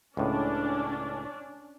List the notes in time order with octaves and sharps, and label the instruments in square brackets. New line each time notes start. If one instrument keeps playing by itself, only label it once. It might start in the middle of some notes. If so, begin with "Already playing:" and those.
[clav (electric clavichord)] C#2 A2 [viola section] C#4 D4 D5